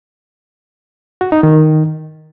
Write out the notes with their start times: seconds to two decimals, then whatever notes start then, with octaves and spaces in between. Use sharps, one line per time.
1.21 F#4
1.32 D#4
1.43 D#3